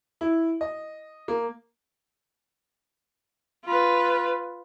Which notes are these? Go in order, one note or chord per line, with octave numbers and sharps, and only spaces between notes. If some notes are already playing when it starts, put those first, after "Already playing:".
E4
D#5
A#3
F4 B4